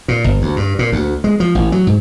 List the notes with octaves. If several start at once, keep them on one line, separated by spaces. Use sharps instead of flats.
A#2
G1
D2
G2
A#2
D2
G#3
F3
A1
F#3
G#2